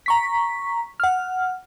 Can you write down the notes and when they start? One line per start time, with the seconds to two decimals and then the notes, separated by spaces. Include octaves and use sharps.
0.06 A#5 C#6 B6
1.00 F#5 F6